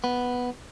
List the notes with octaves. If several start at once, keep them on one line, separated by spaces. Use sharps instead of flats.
B3